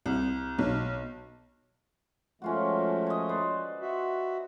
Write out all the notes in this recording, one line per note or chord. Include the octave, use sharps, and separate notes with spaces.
C2
B1
F3 G#3 A3 C#4 F4 F#4
C#5 D#5
B4 C5 D5
F#4 E5